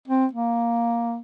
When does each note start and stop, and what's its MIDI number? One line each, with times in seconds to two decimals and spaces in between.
0.08 0.26 60
0.33 1.19 58